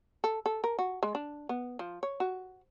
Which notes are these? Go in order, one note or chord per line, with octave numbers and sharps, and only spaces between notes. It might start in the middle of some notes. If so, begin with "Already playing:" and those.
A4
A4
A#4
F#4
G#3
D4
B3
F3
C#5
F#4